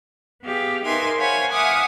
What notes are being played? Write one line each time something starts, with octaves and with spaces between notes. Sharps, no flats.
B3 G4 G#4 F5
D#4 A#4 B4 E5 G#5 C6
C5 C#5 F5 F#5 G#5 B5
E5 F#5 G#5 D6 D#6 F6